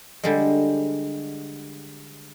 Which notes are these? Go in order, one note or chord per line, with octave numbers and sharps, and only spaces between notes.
D3 G3 G#3